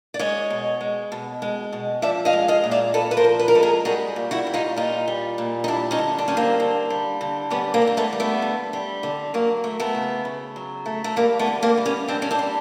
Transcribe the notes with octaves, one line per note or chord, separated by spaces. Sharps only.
D5
G#3 C#5 D#5
B2
G#3
B2
G#3
B2
F3 D5 E5
D#5 F5
G#3
D#5 F5
A#2
D5 E5
A#2 A4 B4
B4
A#4 C5
F3
B4
A#4
G#3 A4 B4
G#4 A#4
G3 F#4 G#4
A#2
E4 F#4
G3
D#4 F4
A#2 D#4 F4
G3
A#2
D#4
G3 D4 E4
C#4 D#4
D3
D4
G3 C#4
A#3 C4
D3
G3
D3
G3 B3 C#4
A#3 C4
D3
C4
A3 B3
G3
A3 B3
D3
G3
D3
F#3 A#3
A3
A3 B3
C#3
C#3
F#3
A3
A3
G3 A#3
A3 B3
D3
A#3 C4
G3
B3 C#4
D3 C4 D4
C#4
C4 D4
G3